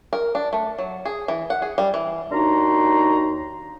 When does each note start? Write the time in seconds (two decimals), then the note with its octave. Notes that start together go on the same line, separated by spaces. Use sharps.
0.13 A#4
0.35 D4
0.53 A3
0.78 F#3
1.05 G#4
1.28 E3
1.50 F#5
1.62 G#4
1.78 G3
1.94 E3
2.31 D#2 D4 D#4 F#4 A#5 C6